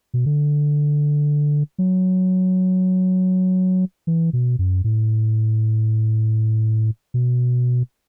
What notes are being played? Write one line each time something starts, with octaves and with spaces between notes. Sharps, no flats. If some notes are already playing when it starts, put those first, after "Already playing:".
B2
D3
F#3
E3
B2
F#2
A2
B2